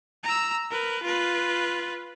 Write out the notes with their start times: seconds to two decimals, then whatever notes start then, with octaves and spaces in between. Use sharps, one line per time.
0.24 A#5 E6
0.70 A#4 B4
1.03 F4 B4